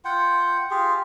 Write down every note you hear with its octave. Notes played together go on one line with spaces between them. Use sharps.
F4 F#5 G5
F4 G4 G#4